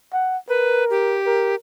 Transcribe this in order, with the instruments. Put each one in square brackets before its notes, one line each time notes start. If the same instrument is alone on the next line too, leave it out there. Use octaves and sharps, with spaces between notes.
[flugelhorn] F#5
[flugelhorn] A#4 [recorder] B4
[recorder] G4
[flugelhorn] A#4